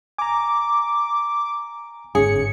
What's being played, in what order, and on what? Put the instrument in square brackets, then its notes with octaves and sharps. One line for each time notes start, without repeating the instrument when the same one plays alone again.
[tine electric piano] G#5 A#5 [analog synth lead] D6
[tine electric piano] G1 G#2 C#4 [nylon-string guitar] G#4 [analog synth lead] C#7